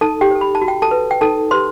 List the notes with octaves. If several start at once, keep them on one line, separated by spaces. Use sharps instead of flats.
D#4 A4 A5
G4 G5
A4 C5
B5
A5
F#4
G5
A4 A5
B4
G5
D#4 A4 A5
G4 B4 C5 C6